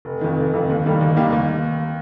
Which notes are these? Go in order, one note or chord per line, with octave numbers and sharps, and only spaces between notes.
F1
F2 D#3
F1
F2 D#3
D#2
D#3 G3 A#3 G4
D#2
D#3 G3 A#3 G4
D#2